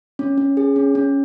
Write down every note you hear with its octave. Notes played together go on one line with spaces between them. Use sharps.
C#4
C#4
G#4
C#4
C#4